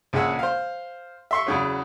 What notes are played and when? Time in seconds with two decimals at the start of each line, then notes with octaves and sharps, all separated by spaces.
0.13 A#1 C#3 G#4 F#5 E6
0.39 C5 F5
1.31 E5 C6 C#6
1.46 E2 C#3 F#3